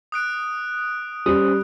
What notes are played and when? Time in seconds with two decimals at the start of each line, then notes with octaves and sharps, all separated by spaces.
0.12 D#6 F#6 D7
1.26 G3 C#4 C5 D#6